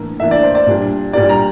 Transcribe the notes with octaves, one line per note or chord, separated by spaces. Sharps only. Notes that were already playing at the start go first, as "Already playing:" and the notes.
Already playing: A2 E3 A#3 D4
A2 E3 A#3 D4 E5
D5
C5
D5
A#2 G3 D4
A#2 G3 D4 D5
A#5